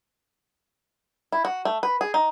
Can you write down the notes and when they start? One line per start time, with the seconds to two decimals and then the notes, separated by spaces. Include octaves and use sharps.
1.32 E4
1.45 F#4
1.65 A3
1.83 B4
2.01 G#4
2.14 D#4